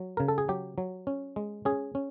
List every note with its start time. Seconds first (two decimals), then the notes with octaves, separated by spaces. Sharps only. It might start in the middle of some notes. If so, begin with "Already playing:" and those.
Already playing: F#3
0.17 C#3 A#4
0.28 A4
0.38 G#4
0.49 F#3 G4
0.78 F#3
1.07 C#4
1.36 G#3
1.65 C#4 G#4
1.95 C#4